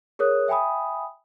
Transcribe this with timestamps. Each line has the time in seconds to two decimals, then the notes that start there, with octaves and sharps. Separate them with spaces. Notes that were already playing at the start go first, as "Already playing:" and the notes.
0.19 G#4 A#4 C#5 D#6 F#6
0.48 E5 G5 G#5 B5 D#6